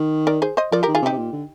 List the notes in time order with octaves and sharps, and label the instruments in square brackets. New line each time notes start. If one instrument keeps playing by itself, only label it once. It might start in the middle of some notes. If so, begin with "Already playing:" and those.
Already playing: [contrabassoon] D#3
[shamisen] A#4 D5
G#4 C5
C5 D#5
[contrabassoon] F3 [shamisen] A#4 D5
[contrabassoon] D#3 [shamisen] G4 A#4
[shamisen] F4 G#4
[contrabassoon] C3
[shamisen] D#4 G4
[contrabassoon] C3
A#2
D3